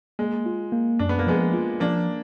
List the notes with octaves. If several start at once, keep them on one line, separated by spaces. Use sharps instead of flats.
G#3 A#3
F4
A#3
F#2 D4
B3
A#3
F3 G#3 B3
F4
F3 A#3 D4